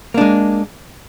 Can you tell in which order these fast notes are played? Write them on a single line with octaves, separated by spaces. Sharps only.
A#3 D4 G#3